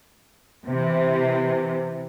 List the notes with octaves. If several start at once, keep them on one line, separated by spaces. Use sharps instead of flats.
C3 E3